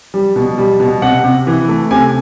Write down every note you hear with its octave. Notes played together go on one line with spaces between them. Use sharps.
G3
B2
G3
B2
C3 F#5
C3
E3
A3
C3 G#5